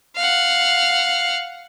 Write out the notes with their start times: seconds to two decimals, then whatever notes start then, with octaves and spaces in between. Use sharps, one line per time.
0.17 F5 F#5